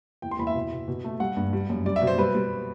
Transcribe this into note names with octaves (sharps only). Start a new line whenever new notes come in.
E2 G5
C6
E2 B5
E5
B2
B2
B2
A3
G3 F#5
G2
G3
F#2
G3 D5
E5
B2
C5
G3 B4
G3